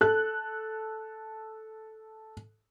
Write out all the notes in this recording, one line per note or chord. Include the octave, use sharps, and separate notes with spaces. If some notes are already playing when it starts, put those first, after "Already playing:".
A4 F#6